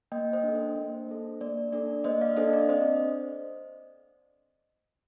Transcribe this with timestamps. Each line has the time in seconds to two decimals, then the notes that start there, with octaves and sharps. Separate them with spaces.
0.12 A#3 D#5 G5
0.33 C5 D#5
0.44 D4 A4
0.54 C5 D#5
0.76 A#3
1.09 D4 A4
1.41 A#3 D5
1.73 D4 A4 D5
2.04 A#3 C5 D#5
2.21 D5 F5
2.37 D4 A4 C5 D#5
2.53 D5
2.69 C4 C5 D#5